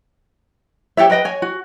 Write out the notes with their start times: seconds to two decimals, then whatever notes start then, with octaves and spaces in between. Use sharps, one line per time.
0.97 G4 A4 C#5 E5
1.10 A#4 B4 D#5 G5
1.25 C#5 G#5
1.42 F#4